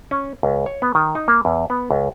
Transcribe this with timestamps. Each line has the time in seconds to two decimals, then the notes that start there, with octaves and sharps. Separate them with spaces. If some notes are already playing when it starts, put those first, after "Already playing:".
0.11 C#4
0.43 C#2
0.66 C#5
0.82 B3
0.95 D#3
1.15 D#4
1.28 A#3
1.45 E2
1.70 B3
1.91 C#2